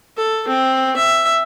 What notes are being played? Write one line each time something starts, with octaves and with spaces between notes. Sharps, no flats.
A4
C4
E5